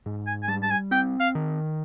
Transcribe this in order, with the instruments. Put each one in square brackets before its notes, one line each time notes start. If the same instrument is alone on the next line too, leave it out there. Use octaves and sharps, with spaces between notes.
[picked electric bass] G#2
[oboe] G#5
G#5
[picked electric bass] G3 [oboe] A5
[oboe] A5
G#5
[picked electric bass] C4 [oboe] G5
[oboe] F5
[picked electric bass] D#3